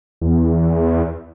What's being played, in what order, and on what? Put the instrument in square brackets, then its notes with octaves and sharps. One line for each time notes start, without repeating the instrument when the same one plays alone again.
[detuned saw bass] E2